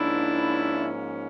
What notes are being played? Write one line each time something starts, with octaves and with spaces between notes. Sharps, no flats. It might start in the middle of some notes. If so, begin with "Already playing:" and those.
Already playing: G#2 F3 A#3 C#4 D4 E4